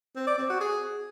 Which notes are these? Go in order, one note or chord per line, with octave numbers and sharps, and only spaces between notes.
C4
D5
C4
F#4
G#4